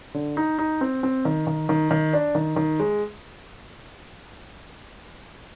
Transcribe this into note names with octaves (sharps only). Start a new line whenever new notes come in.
D3
D#4
D#4
C4
C4
D#3
D#3
D#3
D#3
D4
D#3
D#3
G#3